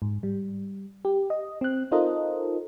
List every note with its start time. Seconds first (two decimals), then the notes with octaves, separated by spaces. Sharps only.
0.02 G#2
0.23 G3
1.05 G4
1.30 D#5
1.61 C4 F#6
1.92 D#4 F4 A4 A#4 C5 D#5